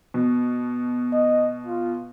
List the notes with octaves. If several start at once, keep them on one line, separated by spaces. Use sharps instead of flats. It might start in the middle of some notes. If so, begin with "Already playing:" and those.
B2
D#5
F4